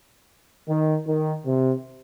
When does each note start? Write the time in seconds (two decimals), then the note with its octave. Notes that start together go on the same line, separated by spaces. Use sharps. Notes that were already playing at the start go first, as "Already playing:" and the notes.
0.69 D#3
1.07 D#3
1.46 C3